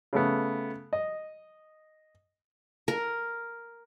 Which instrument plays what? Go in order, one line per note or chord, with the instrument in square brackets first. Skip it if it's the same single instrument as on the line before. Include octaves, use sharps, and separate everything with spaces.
[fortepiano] C#3 A3 B3
D#5
[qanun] A#4